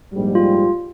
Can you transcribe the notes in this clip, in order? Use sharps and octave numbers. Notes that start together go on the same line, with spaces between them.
A#1 G#2 G3
F4